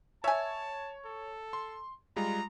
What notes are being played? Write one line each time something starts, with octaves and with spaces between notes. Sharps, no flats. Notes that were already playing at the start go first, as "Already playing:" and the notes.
C#5 E5 G#5 A5
A4
C6
G3 G#3 F4 A#5